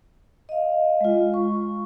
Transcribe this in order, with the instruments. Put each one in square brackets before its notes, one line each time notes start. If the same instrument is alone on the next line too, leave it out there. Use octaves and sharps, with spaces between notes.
[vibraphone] D#5 F5
G#3 F4
C#6